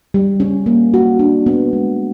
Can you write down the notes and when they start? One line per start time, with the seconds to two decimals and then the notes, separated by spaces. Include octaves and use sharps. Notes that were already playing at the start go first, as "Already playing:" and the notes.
0.14 G3
0.40 C#4
0.66 A#3
0.94 F#4
1.19 D4
1.46 B3
1.73 G#3